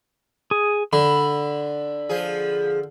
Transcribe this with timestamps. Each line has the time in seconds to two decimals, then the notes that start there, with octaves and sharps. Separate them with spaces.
0.51 G#4
0.93 D3 B5
2.09 F3 G#4